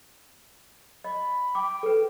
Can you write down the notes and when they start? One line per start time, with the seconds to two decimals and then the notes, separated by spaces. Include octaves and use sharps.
1.04 D#5 B5
1.55 G5 D6
1.83 A4 B4